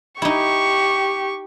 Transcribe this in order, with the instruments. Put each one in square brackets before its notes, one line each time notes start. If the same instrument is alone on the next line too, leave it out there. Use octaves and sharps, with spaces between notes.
[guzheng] D#4 E4 [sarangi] G4 [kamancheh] C#6